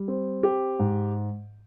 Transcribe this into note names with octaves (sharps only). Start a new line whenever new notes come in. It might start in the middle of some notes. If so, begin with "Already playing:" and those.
Already playing: G3
C4
G4
G#2